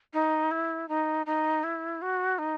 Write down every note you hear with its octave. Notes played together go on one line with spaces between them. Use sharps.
D#4
E4
D#4
D#4
E4
F#4
D#4